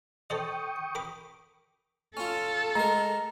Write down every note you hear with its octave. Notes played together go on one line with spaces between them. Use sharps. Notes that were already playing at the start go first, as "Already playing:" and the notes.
A4 C5 D#5 G5 C#6 D#6
A#4 B5 D6
C#4 F4 A4
G#3 A#4 A#5